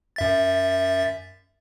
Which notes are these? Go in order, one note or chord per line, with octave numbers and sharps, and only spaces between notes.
F#2 E5 A6